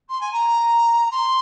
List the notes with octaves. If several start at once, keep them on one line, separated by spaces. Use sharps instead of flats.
C6
G#5
A#5
C6